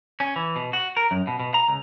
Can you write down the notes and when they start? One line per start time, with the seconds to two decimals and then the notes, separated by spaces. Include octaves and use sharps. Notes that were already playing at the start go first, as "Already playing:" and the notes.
0.20 C#4
0.36 E3
0.56 B2
0.73 F#4
0.97 A#4
1.11 F#2
1.27 B2
1.40 B2
1.54 A#5
1.68 C#2